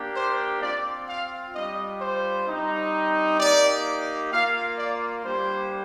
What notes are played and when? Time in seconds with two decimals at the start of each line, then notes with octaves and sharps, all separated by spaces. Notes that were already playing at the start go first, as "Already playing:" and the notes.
Already playing: A#3 D4 G4
0.16 C5
0.62 C4 F4 D5
1.09 F5
1.54 G3 D4 F4 D#5
2.01 C5
2.47 G3 C4 D#4
3.40 A#3 D#4 G4 D5
4.32 A#3 F4 F5
4.78 D5
5.24 G3 A#3 D4 G4 C5